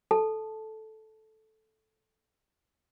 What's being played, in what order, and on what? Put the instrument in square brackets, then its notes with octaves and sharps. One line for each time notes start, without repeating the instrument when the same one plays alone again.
[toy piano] A4 A5